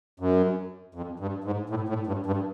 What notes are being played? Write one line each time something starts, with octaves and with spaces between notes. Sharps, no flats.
F#2
F2
G2
G#2
A2
A2
G2
G2